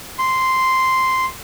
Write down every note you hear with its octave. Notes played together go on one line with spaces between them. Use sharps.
C6